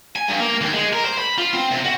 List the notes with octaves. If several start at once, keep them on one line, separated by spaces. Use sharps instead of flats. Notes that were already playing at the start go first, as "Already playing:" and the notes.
G#5
G2
A#3
D#2
G#3
A#4
C5
B5
F4
C4
C3
F#4